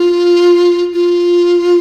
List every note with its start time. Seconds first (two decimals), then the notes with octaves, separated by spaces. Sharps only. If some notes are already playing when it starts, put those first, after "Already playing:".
Already playing: F4
0.93 F4